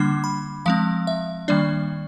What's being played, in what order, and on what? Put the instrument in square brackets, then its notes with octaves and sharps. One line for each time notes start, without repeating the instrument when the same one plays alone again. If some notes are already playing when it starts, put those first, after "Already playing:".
Already playing: [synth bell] D3 G3 A#3 D4 D6
B5
F3 G#3 C4 F5
E5
D#3 G3 A#3 D4 D5